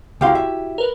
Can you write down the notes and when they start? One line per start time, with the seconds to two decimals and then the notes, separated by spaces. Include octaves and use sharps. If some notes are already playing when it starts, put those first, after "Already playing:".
0.21 C#2 E4 F#4 G4 F5 C6
0.35 E5
0.78 A#4 B4